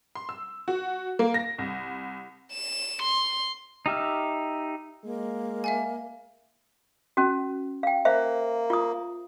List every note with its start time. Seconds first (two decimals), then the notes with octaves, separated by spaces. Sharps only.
0.15 C6
0.29 E6
0.68 F#4
1.19 A#3
1.34 A#6
1.58 C2
2.53 E7
3.02 C6
3.86 D#4 G4 E5 F6
5.04 G#3 A#3
5.64 E5 F5 G#5
7.17 C#4 F#4
7.83 F5 G5
8.05 A#3 C5 E5 F5
8.70 F4 D#6